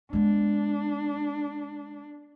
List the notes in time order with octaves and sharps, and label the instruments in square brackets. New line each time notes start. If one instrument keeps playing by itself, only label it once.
[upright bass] G#3 B3 [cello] D4